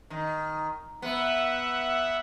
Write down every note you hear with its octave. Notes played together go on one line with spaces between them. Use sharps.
D#3
B3 E5 F#5